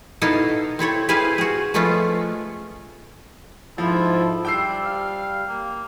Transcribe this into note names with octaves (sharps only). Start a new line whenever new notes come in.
B2 B3 D#4 E4 A4 F5
C4 E4 A4 C#5
E4 G#4 B4 C5 F5 G#5
F#4 G#4
F3 G#3 A3 B3 C#4 F4
G#2 F3 E4 F4 A4
G3 D4 G5 E6 C7
F5
A#3